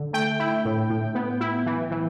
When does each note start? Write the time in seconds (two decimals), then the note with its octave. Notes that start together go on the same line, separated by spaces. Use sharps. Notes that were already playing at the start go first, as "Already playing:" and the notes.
Already playing: D3
0.13 A3 G5
0.40 E4
0.65 A2
0.90 A2
1.15 B3
1.41 E4
1.66 E3
1.91 E3